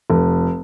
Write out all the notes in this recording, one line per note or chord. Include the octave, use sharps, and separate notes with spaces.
F1